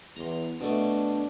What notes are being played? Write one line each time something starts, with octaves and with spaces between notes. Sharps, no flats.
E2 A#5 C6
B2 A3 D4